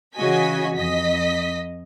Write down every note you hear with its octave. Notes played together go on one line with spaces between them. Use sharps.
C#3 E3 F#4 D#5 G#5 B6
F2 D#5 B6